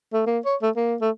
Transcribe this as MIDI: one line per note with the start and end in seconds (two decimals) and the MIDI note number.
0.13 0.23 57
0.26 0.39 58
0.45 0.56 73
0.62 0.70 57
0.76 0.95 58
1.01 1.10 57